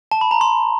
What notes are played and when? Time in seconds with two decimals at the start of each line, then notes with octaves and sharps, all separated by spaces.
0.11 A5
0.21 B5
0.31 A#5
0.41 C6